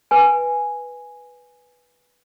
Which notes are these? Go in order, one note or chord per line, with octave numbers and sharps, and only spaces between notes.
B4 G#5